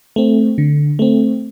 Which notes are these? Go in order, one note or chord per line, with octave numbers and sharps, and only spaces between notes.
A3 C4
D3
A3 C4